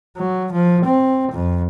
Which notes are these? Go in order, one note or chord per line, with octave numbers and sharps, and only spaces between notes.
F#3
F3
C4
F2